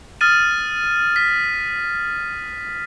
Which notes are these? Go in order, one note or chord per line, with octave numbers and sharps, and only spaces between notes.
D#6 F6 A6 D#7
B6